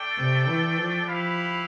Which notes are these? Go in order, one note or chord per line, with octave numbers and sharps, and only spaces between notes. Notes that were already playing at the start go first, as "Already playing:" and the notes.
Already playing: A3 D4 A4 D5 G5
C3
E3
F3
F3 E4 G4 B4 F5